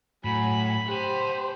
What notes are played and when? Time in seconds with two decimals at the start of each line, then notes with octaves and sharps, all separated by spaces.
0.25 A2 F#3 G#5 B5
0.88 G4 C5 F#5 A5